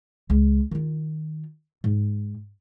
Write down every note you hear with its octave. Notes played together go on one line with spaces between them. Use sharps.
C#2
D#3 F4
G#2